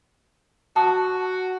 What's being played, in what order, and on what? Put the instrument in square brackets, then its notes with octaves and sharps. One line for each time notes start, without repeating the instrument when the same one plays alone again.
[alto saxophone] F#4 [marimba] A5